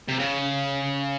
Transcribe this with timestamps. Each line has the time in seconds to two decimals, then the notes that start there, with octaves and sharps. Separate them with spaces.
0.08 C3
0.19 C#3